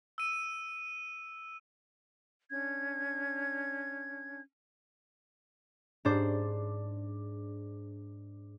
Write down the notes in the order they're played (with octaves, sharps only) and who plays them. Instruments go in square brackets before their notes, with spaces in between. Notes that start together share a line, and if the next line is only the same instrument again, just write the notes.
[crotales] E6 D#7
[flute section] C#4 D4 G#6
[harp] G#2 D4 C5